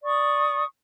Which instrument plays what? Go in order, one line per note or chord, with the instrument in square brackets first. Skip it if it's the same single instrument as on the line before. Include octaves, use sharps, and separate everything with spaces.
[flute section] D5 C#6 D#6